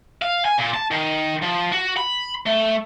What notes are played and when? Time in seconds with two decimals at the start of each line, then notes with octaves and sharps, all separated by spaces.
0.22 F5
0.45 G#5
0.59 A#2
0.74 A5
0.91 D#3
1.43 F3
1.72 F#4
1.97 B5
2.46 A3